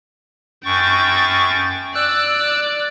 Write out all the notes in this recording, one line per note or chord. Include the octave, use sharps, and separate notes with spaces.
F#2 G5 C#6 A6
D5 E6 F#6